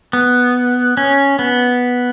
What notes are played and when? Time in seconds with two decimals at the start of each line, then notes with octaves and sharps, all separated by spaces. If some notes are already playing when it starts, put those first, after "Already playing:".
0.13 B3
0.97 C#4
1.39 B3